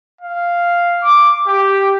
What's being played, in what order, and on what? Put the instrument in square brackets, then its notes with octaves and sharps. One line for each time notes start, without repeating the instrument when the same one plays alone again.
[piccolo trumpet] F5
D6
G4